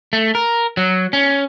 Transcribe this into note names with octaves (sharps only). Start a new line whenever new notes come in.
A3
A#4
F#3
C#4